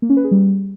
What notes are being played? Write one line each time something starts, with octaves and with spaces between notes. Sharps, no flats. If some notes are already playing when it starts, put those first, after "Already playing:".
A#3
C#4
B4
G#4
G3